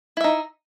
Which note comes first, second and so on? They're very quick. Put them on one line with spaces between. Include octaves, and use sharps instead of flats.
E4 E5 D#4